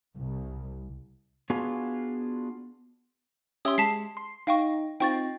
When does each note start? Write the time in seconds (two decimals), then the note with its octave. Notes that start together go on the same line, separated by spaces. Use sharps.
0.16 C2
1.50 B3 D4 F4 F#4 G#4
3.65 C#4 G4 E5 C6 D#6
3.78 G#3 A5 B6 C7
4.17 C6
4.47 D#4 F5 G5 C#6
5.00 C4 D#4 F4 G5 C#6 A6